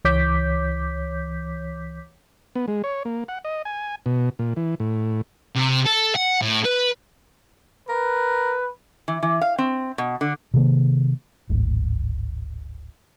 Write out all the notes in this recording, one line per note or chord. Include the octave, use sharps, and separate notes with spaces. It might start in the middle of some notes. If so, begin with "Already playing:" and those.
C#2 E3 C#5 D6 G6 B6
B3
G#3
C#5
A#3
F#5
D#5
G#5
B2
A#2
E3
A2
C3
A4
F#5
A2
B4
A#4 B4
E3
E3
F5
C4
B2
D3
C3 D#3 A#3
D1 G#1